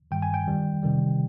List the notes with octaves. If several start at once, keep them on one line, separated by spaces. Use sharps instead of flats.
G2 D#3 G3 G5
G#5
G5
F2 D#3 G3
C3 D#3 G3